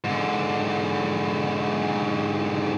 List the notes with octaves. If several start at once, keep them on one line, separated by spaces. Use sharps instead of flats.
G#2 D3